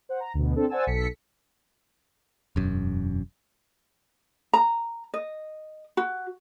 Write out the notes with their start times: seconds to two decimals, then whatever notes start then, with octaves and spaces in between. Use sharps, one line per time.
0.09 C5 F#5
0.20 A#5
0.34 D2 B2
0.56 C4 D4 A4
0.69 C5 D5 F#5 G#5 A5 E6
0.87 B1 A4 B6 C#7
2.56 E1 F#2
4.53 A#5
5.14 D#5
5.97 F#4